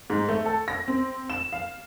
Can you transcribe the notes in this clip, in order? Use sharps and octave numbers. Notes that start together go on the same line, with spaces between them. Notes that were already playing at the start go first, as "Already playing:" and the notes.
G#2
A3
A4
A#6
C4
E7
F5